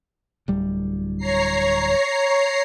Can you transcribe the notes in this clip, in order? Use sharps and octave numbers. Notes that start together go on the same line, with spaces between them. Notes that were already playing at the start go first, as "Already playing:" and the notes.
D1 G3
C#5 A#5 C7